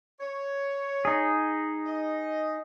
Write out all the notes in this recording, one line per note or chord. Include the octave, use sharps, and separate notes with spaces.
C#5
D#4 G#4
D#5